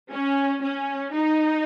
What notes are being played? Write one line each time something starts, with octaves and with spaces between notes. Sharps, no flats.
C#4
C#4
D#4